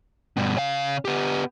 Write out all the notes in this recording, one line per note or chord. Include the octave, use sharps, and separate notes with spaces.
G2 B2
C#3 F5
B3 G4